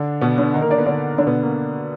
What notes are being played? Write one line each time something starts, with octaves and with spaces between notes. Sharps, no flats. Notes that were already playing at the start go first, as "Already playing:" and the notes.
Already playing: D3 D4
B2 B3
D3 D4
D#3 D#4
A#3 A#4
D4 D5
B3 B4
D3 D4
D3 D4
B2 B3
A#3